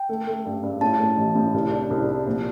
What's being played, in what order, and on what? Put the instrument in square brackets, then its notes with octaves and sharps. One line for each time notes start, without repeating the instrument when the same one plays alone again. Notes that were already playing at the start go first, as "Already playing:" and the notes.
Already playing: [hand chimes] G5
[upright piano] A3
A3
G2
G2
[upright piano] A2 [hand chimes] A5
[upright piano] A2
A1
A2
C2
D4
C2
D4
A#1